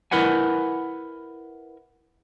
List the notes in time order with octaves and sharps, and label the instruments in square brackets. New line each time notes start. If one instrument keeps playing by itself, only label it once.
[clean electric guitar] E4 A#4 B4 F#5 G#5